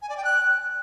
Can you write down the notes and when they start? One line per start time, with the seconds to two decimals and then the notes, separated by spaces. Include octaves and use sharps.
0.02 G#5
0.10 D5
0.17 G5
0.25 F#6